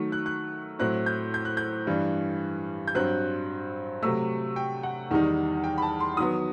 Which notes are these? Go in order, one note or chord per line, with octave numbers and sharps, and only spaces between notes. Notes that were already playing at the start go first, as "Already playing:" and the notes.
Already playing: D#3 F#3 A3
F#6
F#6
A2 F#3 C4 E4 F#6
G6
G6
F#6
G6
G2 E3 G3
G6
G2 F#3 C4 F#6
C3 F#3 A3 E6
G5
F#5
E2 D#3 G3 D#4
G5
B5
A5
C6
D#3 F#3 B3 D#6